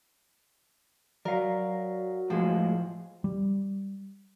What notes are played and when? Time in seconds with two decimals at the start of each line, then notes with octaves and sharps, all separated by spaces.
1.25 F#3 A#4 D5 F5
2.30 A2 F3 G#3 G#4
3.24 G3